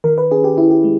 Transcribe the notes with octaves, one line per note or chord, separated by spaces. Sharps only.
D#3 A#4
B4
C#4 G#4
G4
C#4 E4
G4
G#3